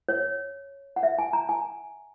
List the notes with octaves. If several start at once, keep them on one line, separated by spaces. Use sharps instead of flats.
C#5
F#5
E5
G#5
A#5
G#5